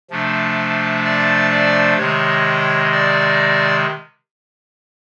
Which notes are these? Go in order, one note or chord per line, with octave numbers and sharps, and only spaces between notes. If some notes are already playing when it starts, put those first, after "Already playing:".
C3 F3 A3 D4
D5
D5
C3 D#3 G#3 C#5
D5